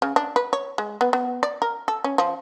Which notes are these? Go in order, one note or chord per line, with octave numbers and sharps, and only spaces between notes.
C#3
D4
B4
C#5
G#3
B3
B3
D5
A#4
A4
C#4
F3